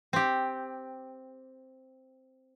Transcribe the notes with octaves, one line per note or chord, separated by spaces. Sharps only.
C4 G4